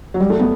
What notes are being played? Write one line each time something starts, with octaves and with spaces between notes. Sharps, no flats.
F#3
G3
A3
B3